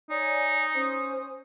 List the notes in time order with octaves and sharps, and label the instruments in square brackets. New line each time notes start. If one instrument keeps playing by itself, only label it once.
[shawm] D#4 [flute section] C#5 D5 G#5
[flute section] C#4 C5 D#6